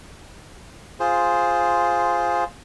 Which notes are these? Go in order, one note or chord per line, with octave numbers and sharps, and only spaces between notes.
F4 G#4 C5